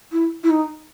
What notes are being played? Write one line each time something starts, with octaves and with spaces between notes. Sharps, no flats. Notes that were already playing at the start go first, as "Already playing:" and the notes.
E4
E4
D#4